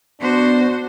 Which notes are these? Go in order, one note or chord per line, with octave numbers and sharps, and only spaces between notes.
B3 D4 F#4 C5